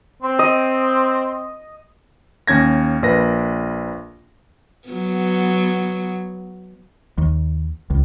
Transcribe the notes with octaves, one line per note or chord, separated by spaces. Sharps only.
C4
D#5
D#2 C#4 G#6 A#6
A#1 A#3 B4 A#6
F#3 B3
D#2
C#2